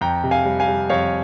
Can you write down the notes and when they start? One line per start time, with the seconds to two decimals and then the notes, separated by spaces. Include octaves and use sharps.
0.01 F2 G5 A#5
0.24 C3
0.31 F5 G#5
0.45 G3
0.60 F5 G#5
0.67 G3
0.89 F2 C#5 F5